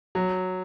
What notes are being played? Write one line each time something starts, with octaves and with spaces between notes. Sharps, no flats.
F#3